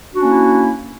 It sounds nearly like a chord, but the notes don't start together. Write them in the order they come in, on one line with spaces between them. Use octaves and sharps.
D4 F#4 C#4 A#3 E4